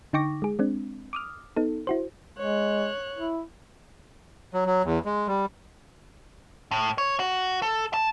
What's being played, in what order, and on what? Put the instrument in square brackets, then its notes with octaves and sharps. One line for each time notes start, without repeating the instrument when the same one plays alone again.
[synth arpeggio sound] D3 D#4 G5 C#6 D6 A#6
G#3 G#4
G#3 C4 D4
D6 D#6 F6
B3 D#4 A4
E4 F#4 C5
[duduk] G#3 [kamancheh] C#5 F#6
[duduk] E4
[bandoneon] F#3
F#3
E2
G#3
G3
[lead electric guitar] A2
C#5
F#4
A4
A5